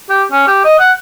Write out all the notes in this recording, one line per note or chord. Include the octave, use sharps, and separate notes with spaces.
G4
C#4
G4
D#5
F#5